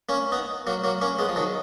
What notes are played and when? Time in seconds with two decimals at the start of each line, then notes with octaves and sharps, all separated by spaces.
0.09 A#3 C#4
0.32 B3 D#4
0.67 F#3 A#3
0.84 F#3 A#3
1.02 A#3 C#4
1.19 G#3 B3
1.29 F3
1.36 D#3 F#3